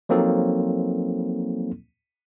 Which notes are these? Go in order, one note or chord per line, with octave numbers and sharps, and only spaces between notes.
F3 F#3 A#3 C4 D#4 A4